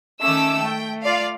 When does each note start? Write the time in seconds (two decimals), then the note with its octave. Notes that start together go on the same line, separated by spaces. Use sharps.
0.21 D#3 A3 C#4 D6 E6
0.61 A3 G5
1.02 F4 D5 F5